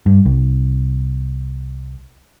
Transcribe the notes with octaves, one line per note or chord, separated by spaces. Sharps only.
G2
C2